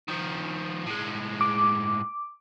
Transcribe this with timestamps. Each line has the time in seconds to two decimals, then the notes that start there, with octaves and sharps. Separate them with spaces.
0.08 D#3 F3
0.86 A2 G#3
1.41 D6